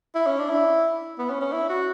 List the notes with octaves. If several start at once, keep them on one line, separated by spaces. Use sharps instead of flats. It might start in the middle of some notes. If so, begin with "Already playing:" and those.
E4
C#4
D4
E4
B3
C#4
C#4
E4
F#4